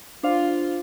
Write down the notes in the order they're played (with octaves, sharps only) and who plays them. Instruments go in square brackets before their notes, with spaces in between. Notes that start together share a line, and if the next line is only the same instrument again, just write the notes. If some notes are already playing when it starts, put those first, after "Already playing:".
[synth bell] D4 C5 F5 [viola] F4